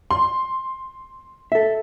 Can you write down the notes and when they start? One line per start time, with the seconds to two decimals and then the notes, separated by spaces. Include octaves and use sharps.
0.11 C6
1.52 A4 E5